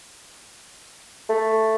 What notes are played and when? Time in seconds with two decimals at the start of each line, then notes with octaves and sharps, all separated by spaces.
1.29 A3